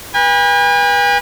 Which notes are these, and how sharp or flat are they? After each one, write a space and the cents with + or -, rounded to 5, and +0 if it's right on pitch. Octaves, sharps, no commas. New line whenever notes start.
B4 -30 G#5 -45